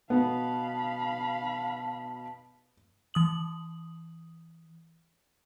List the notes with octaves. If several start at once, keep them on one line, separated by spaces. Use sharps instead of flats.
B2 B3 F5 A5 B5
E3 D#6 F#7